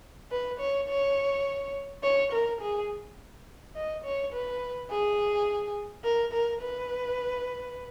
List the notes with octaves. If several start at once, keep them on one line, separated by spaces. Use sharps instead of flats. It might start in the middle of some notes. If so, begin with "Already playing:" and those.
B4
C#5
C#5
C#5
A#4
G#4
D#5
C#5
B4
G#4
A#4
A#4
B4